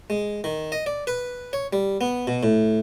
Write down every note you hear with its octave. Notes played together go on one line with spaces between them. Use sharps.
G#3
D#3
D#5
D5
B4
C#5
G3
B3
B2
A2